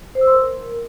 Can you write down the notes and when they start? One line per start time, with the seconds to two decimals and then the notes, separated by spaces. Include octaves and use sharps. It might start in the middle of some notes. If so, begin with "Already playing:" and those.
0.15 C5
0.21 E6
0.27 C6
0.33 A#4